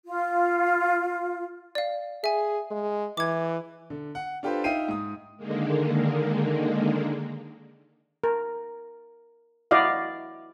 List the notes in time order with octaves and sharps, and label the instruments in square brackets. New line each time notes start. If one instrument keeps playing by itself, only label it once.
[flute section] F4
[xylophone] D5 F5
[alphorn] G#4 [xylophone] E5 G#5
[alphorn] G#3
[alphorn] E3 [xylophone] D6 G#6
[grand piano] D3
F#5
D4 F4 G4 A4 B4 C5
D#4 E5 F5 G5 C7 D#7
G#2 D#6
[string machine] D3 D#3 G#3 A#3
[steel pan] A#4
E4 F#4 D5 D#5 F5